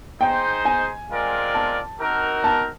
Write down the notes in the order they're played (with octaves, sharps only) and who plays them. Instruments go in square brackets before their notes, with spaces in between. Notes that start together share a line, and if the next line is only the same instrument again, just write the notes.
[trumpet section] D#4 G#4 C5 D#5 [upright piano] G5
[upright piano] G#5
[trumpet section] G#3 C4 F4 A#4 D5
[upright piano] A5
[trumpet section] C4 D#4 F#4 A#4
[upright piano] A5